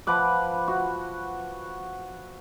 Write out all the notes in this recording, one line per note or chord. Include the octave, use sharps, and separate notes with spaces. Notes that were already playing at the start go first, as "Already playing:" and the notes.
F3 B4 F#5 D6
F#4